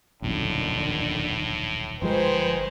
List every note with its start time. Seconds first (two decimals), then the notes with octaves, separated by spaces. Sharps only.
0.22 D#1 B1 F2 A2 D3 D#3
2.02 G1 D#3 F3 G#3 B4 C5 G#5